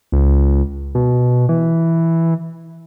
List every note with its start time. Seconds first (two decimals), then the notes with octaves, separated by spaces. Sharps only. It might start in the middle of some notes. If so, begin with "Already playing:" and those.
0.12 C#2
0.95 B2
1.49 E3